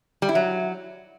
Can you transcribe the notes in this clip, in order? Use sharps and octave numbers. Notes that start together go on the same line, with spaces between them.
G3
E4
F#3